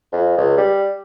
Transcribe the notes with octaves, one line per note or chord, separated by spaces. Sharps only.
F2
C#2
G3